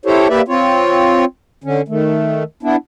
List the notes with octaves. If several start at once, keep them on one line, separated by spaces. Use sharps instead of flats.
E4 G4 A4 C5 C#5
A#3 G4 B4 D5 E5
C4 F4 C#5
D3 C#4
D#3 A3
B3 D4 E4